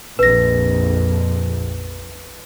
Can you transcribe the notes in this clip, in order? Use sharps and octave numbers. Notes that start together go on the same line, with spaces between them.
A#1 F2 B4 A#6